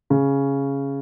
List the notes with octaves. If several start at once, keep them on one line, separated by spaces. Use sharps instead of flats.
C#3